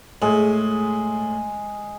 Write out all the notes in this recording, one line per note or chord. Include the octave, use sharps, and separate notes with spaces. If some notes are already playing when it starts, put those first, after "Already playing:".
A2 G#3